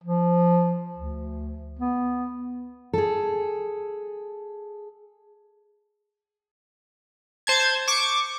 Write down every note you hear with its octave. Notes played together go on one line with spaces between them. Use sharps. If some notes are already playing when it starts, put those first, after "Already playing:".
F3
D2
B3
G#4 A4
C5 A5 G#6
C#6 D6